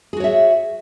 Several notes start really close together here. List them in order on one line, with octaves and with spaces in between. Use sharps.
G#4 F#4 C#5 E5